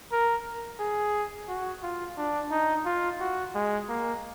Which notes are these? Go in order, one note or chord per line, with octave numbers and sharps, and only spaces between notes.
A#4
G#4
F#4
F4
D4
D#4
F4
F#4
G#3
A#3